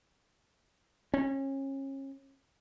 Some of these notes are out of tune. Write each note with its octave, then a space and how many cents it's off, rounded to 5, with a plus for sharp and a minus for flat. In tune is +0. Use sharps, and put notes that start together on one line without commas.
C#4 -30